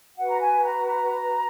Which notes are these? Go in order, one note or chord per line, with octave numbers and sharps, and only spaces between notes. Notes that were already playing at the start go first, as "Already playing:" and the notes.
F#4 B4 F#5
A#5
G#5
A#5
A#5